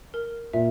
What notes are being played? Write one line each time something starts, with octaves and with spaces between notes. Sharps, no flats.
A#4
A#2 E5